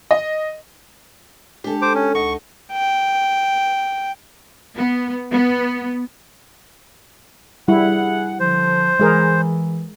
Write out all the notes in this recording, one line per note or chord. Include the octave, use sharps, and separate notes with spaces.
D#5
G#3 D4 G4 A4
C5 D6
C#4
D2 D#4 F#5 C#6 A#6
G5
B3
B3
G3 E4 G#4 F#5
D3 F3 C5
E3 G#3 G#4 A#4